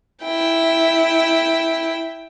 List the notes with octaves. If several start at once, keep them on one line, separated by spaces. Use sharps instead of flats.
E4 G5